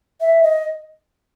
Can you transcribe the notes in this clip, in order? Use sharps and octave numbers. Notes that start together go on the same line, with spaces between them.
E5
D#5